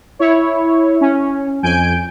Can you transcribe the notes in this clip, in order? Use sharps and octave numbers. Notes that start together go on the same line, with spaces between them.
E4 C#5
C#4
F2 G#5 G6 D7